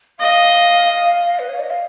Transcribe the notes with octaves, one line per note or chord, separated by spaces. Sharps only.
D#5 F5
B4
C#5
D#5
F5